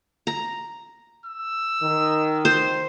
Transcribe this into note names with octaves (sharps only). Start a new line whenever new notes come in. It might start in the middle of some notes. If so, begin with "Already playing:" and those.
A#5
E6
D#3
C5